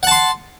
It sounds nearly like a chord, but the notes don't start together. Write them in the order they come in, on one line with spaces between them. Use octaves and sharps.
F#5 A5 C6